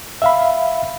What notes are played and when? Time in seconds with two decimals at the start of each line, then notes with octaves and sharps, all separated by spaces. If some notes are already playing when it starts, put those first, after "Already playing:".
0.22 E5 F5 B5